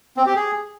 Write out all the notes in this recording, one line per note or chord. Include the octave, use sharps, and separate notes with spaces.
C4
G4
G#4